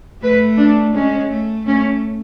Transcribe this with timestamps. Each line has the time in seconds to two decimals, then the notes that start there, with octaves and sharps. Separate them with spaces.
0.22 A3 B4
0.58 D4
0.94 G#3 C#4
1.30 A3
1.66 A3 C#4